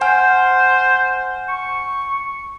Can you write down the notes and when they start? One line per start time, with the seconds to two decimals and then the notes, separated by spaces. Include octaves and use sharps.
0.01 C5 F#5 G#5 F6
1.49 C#6